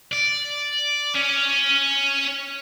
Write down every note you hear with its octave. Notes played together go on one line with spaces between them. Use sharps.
D5
C#4